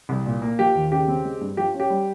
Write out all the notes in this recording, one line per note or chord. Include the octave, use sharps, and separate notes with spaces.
C2
A#2
A#3
F3 G4
D#2
C#3 G4
C4
G#3
G2
F3 G4
C#4
G4
G3